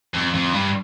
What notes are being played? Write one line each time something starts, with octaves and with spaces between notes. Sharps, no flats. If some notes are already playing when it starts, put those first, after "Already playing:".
F2
F2
G2